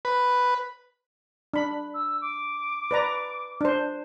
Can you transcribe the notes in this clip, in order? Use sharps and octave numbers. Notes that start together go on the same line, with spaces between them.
B4
D4 B5
E6
D6
B4 D5 A#5
D4 C5